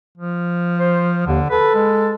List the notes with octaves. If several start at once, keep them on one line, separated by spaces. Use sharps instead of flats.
F3
C5
D#2 D3
A4 B4
G#3